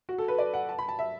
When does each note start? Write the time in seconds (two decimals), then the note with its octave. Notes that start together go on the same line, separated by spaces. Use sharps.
0.09 F#4
0.18 A4
0.28 B4
0.38 D5
0.54 F#5
0.69 A5
0.79 B5
0.89 A5
0.99 E5